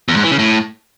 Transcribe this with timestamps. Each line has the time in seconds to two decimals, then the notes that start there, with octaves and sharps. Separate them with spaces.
0.08 E2
0.16 G#2
0.24 E3
0.31 C#3
0.39 A2